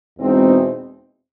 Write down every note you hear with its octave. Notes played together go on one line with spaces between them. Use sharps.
E2 B2 G#3 C4 D#4